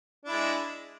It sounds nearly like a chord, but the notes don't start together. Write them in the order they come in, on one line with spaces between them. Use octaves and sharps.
D4 E4 G#3